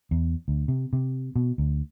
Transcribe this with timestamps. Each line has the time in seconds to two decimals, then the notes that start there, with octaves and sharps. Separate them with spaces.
0.11 E2
0.48 D2
0.68 C3
0.93 C3
1.36 B2
1.58 D2